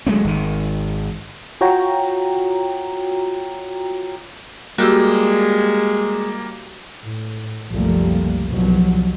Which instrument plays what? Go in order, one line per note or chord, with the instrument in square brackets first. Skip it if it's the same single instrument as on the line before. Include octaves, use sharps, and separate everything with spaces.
[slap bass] F#3 G#3 A3 C4
G#1 D#3
[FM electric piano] F4 F#4 C#5 G5 A#5
[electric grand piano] G3 A#3 [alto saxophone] G#3 [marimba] F#4 G4 E6
[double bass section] A2
F#1 C2 F3 G3 A3 A#3
C2 B2 F3 F#3